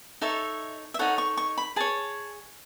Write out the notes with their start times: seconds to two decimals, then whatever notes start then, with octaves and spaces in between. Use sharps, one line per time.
0.21 D#4 A4 C#5 E5
0.94 E5
0.99 D#4 A4 C#5 F#5
1.18 C#6
1.37 C#6
1.58 B5
1.76 G#4 C#5 A5